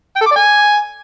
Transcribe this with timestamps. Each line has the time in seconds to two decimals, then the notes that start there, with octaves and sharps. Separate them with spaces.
0.16 G5
0.21 A4
0.26 D6
0.31 D5
0.36 G#5